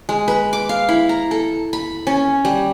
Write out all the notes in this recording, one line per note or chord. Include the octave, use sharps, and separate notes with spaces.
G#3
B4
D6
F5
E4
A#5
A4
B5
C#4
G3